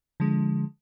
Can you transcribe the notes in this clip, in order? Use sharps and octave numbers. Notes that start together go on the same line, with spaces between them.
D3 F3 G#3